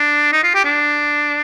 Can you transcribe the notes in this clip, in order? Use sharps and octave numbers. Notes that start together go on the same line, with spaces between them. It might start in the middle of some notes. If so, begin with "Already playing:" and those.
Already playing: D4
D#4
F4
G4
D4